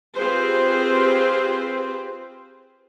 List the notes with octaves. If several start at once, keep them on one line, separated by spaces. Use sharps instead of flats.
C4 F4 G4 G#4 B4 C5